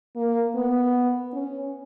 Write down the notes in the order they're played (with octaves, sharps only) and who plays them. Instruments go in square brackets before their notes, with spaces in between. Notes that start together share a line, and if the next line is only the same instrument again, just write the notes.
[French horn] A#3
B3
C#4